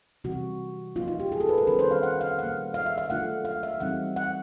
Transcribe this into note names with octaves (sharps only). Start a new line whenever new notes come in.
C3 E3 G3 F#4
F3 A#3 D#4 F4
F4
G4
G#4
A4
B4
A#4
D#3 G3 A#3 C#4 B4
C5
F5
F#5
F5
D#3 G3 A#3 F#5
F5
E5
F5
F#3 A3 D4 F4 F#5
F5
E5
E3 G3 C4 D#4 F#5
F#5